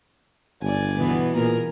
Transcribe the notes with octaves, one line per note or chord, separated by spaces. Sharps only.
G1 D5 G#5
B2 E3 B3
A#2 G#4 A#4